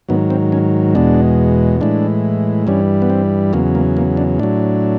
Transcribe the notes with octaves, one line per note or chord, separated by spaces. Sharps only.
G#2 D#3 F#3 B3
C4
C#4
E2 B2 G#3 D4
A2 E3 G#3 D4
G2 E3 G3 C#4
B3
C4
E2 C#3 F#3 A#3
A#3
A#3
D4
A2 F#3 D4